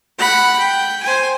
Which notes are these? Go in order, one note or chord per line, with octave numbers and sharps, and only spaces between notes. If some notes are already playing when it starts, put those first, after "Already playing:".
F#5 B5
G5
C5 G#5